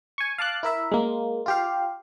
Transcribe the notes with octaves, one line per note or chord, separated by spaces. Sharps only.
G#5 C#6
F5 A5 D6 F#6
E4 A#4 E5
G#3 A#3
F4 G4 F5